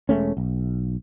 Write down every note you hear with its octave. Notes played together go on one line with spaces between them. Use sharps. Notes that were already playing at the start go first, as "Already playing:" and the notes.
E1 G#3 A3 C#4
B1